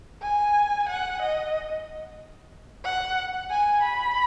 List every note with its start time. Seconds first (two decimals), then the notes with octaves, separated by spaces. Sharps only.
0.22 G#5
0.89 F#5
1.22 D#5
2.84 F#5
3.51 G#5
3.83 B5